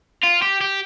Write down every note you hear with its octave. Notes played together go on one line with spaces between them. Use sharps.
F4
G4
G4